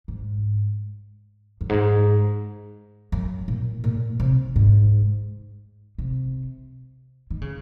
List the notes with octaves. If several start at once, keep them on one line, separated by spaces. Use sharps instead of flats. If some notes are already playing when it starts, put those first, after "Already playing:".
G#2
F#2
G#2
F#2
A#2
A#2
C3
G#2
C3
D#3
C#3